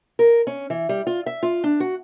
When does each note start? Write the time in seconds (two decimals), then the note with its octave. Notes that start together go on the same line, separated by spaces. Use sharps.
0.19 A#4
0.47 C#4
0.70 E3
0.89 G3
1.07 F4
1.26 E5
1.43 F4
1.64 D4
1.80 F#4